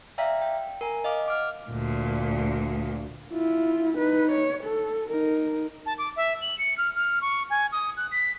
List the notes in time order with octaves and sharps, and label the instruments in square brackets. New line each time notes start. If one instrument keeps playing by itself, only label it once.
[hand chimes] D5 E5 F5 G5 A#5 B6
G5
A#4 G#5 A#5
D#5 F5 D6
F#5 D6 F6
[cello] D2 A#2
[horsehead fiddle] E4 F4
D#4 B4
C#5
A4
D#4 A#4
[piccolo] A5
D6
E5
F#7
C#7
F6
F6
C#6
G#5
D#6
F#6
B6